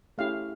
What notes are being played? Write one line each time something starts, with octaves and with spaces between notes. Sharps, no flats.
A3 C#4 E4 G4 F5